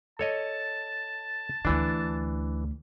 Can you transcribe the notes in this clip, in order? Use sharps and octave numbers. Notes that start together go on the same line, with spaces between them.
A4 C#5 D#5 A5
D2 D3 E3 D4